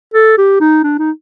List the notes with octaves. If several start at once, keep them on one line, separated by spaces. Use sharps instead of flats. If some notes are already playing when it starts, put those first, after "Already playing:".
A4
G4
D#4
D4
D#4